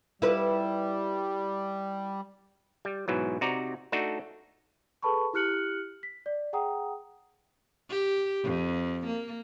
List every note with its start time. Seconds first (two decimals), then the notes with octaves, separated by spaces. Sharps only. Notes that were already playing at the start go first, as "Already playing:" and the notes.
0.22 G3 E4 B4
2.85 G3
3.08 G#2 B2 E3 F#3
3.41 C3 D#4 F#4 D5 A#5
3.92 A3 D4 D#4 F#4 A4
5.02 G#4 A4 B4 A5 B5 C#6
5.33 E4 G4 F6 F#6 C#7 F#7
6.03 B6
6.26 D5
6.53 G#4 F#5 G5 A#5 D#6
7.89 G4
8.44 F2
9.07 A#3